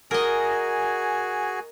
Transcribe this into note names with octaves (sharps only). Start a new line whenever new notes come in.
F#4 G#4 A#4 D#5 G#5